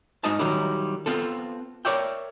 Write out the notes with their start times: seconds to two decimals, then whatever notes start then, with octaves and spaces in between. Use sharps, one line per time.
0.24 G#2 G#3 D#4 D#5 A5
0.39 D#3 F#3 G3 E4
1.06 B3 C4 F4 A4
1.85 A#4 C#5 D5 E5 G5